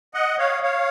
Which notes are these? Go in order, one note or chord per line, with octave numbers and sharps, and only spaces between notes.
D#5 F#5
C#5 F5
C#5 F5